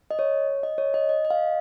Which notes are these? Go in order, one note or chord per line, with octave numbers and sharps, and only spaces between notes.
D#5
C#5
D#5
C#5
D#5
D#5
D#5
F5